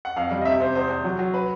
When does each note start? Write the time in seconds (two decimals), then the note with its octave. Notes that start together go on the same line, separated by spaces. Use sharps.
0.05 F#5
0.16 F2 F5
0.31 G3
0.41 D#5
0.45 C3 E5
0.60 C3 C5
0.75 E2 C5
0.89 E2
1.04 F#3
1.19 F#3
1.34 B4